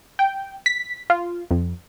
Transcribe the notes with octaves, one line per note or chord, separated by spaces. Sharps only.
G5
B6
F4
F2